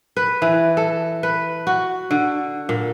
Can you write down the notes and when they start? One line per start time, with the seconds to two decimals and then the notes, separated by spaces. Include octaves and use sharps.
0.17 B4
0.42 E3
0.77 A4
1.23 B4
1.67 F#4
2.11 D3
2.69 A#2